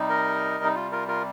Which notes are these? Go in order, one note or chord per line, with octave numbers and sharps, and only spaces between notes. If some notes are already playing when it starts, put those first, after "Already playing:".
Already playing: C3 G3 D#4
A#4 D#5
D#4
F4
F4 A#4
F4 A#4